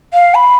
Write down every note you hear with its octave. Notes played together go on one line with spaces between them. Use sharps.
F5
B5